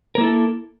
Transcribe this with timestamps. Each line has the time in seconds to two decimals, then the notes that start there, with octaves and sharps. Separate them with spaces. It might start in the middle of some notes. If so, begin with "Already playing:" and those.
0.15 A#4
0.18 A#3
0.21 E4
0.23 A4